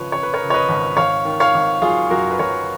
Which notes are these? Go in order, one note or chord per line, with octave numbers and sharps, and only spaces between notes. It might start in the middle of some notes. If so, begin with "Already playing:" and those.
Already playing: G#1 C#3 F3 B4 C#5
C#3 C#5
B4
A#4 C#5
C#3
C#5
B4 D#5
G#1
G#1 C#5 F5
D#3
C#5 F5
G#1
F#3 F4 G#4
F#2 F#4 A#4
B4
F#3 A#4 C#5